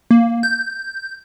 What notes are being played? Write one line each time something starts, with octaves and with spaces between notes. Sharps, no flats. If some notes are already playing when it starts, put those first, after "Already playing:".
A#3
G6